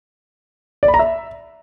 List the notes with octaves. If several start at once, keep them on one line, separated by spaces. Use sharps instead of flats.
D5
B5
A#5
E5